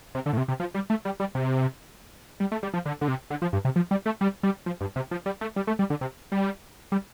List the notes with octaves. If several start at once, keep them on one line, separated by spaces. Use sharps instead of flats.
C3
D3
A2
C3
C3
F3
G3
A3
G3
G3
C3
G3
A3
G3
F3
D3
D3
C3
D3
F3
G2
C3
F3
G3
A3
G3
G3
F3
G2
C3
F3
G3
A3
G3
A3
G3
D3
C3
G3
G3